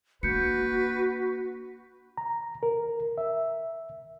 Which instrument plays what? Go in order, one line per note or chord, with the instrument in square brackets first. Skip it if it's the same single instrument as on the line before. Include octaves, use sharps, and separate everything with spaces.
[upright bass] A#3 D4 [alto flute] F#4 [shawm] B4 [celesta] G6 C#7
[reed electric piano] A#5
A#4
E5